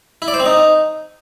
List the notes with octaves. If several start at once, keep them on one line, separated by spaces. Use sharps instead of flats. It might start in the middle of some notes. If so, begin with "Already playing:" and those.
E4
D5
C5
C4
D#4